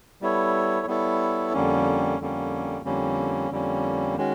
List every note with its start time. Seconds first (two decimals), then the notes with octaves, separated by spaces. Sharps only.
0.21 G3 B3 E4 A4 C#5
0.87 G3 B3 E4 A4 C#5
1.53 F2 D3 G3 A#3 C#4
2.19 F2 D3 G3 A#3 C#4
2.85 F2 D3 G3 A#3 C#4
3.51 F2 D3 G3 A#3 C#4
4.17 D#3 G#3 C#4 F#4